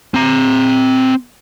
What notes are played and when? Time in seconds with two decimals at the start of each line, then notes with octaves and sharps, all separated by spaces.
0.14 C4 A#5